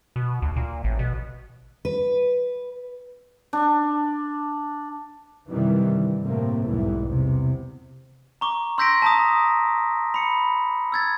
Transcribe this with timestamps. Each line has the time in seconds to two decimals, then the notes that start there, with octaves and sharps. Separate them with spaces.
0.16 B2
0.42 D2
0.56 A#2
0.84 A1
0.99 B2
1.85 B4
3.53 D4
5.49 F#2 C3 D#3 E3 G3
5.86 G2
6.24 A2 C3 A3 A#3 C4
6.65 B1 E2 G#2 E3 G3
7.02 E2 C3
8.41 A#5 C#6 D6
8.78 C6 E6 G6 A#6 B6 D7
9.02 A5 A#5 D#6
10.14 B5 C#7
10.92 E6 G#6 A6